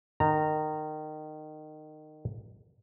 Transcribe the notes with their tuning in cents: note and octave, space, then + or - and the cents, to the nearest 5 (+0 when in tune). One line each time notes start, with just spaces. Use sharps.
D#3 -20 A#5 -15